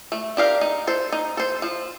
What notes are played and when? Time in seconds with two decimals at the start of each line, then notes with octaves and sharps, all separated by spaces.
0.12 A3
0.37 D4 G4 A#4 F5
0.61 D#4
0.87 A4 C5
1.12 D#4
1.37 A4 C5
1.62 F3